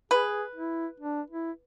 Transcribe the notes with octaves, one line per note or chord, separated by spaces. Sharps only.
G#4 B4
E4
D4
E4